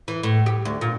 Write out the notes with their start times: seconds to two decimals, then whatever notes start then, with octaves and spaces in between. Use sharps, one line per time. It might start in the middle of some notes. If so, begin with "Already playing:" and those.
0.08 E3
0.23 A2
0.46 G4
0.65 D2
0.81 A#2